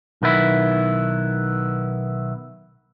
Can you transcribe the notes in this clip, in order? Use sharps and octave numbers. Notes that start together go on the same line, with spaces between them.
B1 D#3 B3 E4